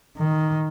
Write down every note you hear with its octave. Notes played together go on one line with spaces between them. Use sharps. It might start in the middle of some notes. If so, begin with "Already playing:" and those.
D#3